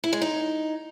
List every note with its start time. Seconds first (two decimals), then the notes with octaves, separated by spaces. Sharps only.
0.04 E4
0.13 G#3
0.22 D#4